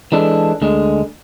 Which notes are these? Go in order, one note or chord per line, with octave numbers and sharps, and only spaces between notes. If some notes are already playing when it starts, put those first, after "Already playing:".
E3 G#3 D4 A4
D2 D3 G#3